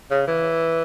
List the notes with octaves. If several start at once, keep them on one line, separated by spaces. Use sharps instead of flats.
C#3
E3